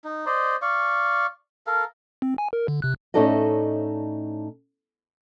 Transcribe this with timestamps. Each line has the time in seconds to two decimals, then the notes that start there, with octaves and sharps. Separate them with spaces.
0.04 D#4
0.26 C5 D5 D#5
0.62 D5 F5 C#6
1.67 A4 A#4 F5
2.22 C4
2.38 G#5
2.53 A#4
2.68 D3
2.82 C3 F#6
3.14 A2 C#4 D#4 A4 D5 D#5